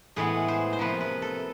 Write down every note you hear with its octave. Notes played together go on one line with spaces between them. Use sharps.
A2 E3 G#3 B3 G#4
C5
C5
C3 F3 A#3 B4
B4
A4